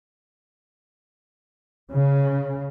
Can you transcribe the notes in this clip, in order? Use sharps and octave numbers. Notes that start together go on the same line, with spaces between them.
C#3